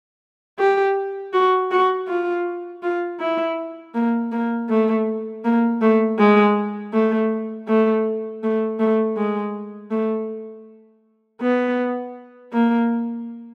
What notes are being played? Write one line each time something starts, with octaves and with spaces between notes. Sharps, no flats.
G4
F#4
F#4
F4
F4
E4
A#3
A#3
A3
A#3
A3
G#3
A3
A3
A3
A3
G#3
A3
B3
A#3